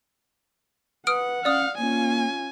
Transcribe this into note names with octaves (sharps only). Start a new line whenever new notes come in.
B4 F#5 D#6 F6 D7
C#4 D5 F5 D#6
A#3 C#4 F4 G#5